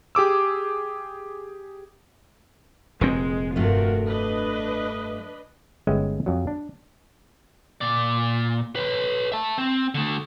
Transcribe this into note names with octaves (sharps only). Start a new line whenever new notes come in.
G4 G#4 D6 E6
F1 A#2 G#3 C4
G2 A3 F4 F#4 A#4
D4 B4 D#5
G1 G#3 C#4 D#5 E5 G5
F2 F#3
D4
A#2 D5
B4 C#5
E5 A5
C4
D3 A3